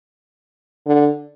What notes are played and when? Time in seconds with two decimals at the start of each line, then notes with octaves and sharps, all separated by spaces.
0.86 D3